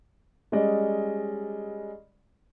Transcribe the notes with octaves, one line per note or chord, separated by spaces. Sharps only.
G3 G#3 C#4 D5 D#5